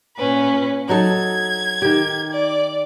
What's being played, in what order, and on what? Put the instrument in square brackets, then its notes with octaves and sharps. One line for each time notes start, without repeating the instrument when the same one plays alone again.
[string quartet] A#2 C#4 B4
[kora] F#3 D#4 A4 [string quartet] G#6
[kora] D#3 G4
[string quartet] D5